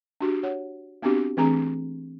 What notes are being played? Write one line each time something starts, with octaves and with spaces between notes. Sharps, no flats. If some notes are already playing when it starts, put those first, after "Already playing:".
D4 F#4 G4
C#5 F#5
B3 C4 D4 F#4 G4
E3 A3 C4 D4 G#4 A#5